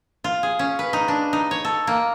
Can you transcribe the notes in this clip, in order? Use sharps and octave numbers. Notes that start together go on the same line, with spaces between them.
F4
G#4
C#4
B4
D#4
D4
D#4
C#5
A4
A#3